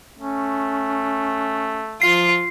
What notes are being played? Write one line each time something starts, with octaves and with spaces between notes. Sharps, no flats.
A3 C#4
F3 F4 C7